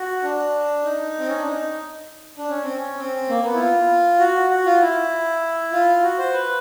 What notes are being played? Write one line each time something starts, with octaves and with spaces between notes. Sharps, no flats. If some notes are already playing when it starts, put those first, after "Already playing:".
Already playing: F#4
D4
D#4
C4
C#4
D4
D#4
D4
C#4
C4
C#4
C4
A#3
B3
E4
F4
F#4
F#4
F4
E4
F4
F#4
C5
B4